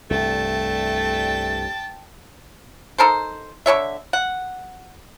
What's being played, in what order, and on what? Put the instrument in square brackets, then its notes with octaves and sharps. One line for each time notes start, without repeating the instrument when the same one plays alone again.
[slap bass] C2 G2 [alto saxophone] A3 [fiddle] G5 A5 [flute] A6
[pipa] D#4 A4 A#4 C5
D3 A4 C#5 E5
F#5